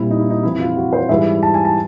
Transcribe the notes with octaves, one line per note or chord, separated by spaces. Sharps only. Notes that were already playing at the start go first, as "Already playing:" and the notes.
Already playing: A#2 G3 C4 E4
D#4
E4
D#4
F2 C3 E3 E4
F4
F#4
C5
C#5
G#2 E3 G3 E5
A5
G#5
A5